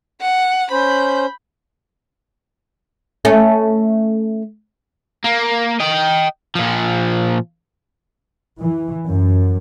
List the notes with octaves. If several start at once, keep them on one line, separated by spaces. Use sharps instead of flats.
F#5
C#4 C5 B5 G6
A3 C#4
A#3
D#5 G5
A#2 F3
E3
F#2